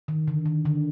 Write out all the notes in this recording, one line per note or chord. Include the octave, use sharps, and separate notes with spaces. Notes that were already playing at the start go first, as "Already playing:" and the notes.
D#3
D3
D#3
D3